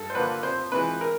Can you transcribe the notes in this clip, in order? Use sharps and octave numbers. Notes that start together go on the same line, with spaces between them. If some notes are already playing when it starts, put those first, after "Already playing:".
Already playing: G2 A4
C5
D3 F3 A#3 D4 B4
F2 C5
C3 E3 G#3 B4
A#4